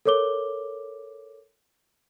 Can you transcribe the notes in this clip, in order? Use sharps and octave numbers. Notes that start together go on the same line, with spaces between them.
A4 A#4 C#5 D6 G7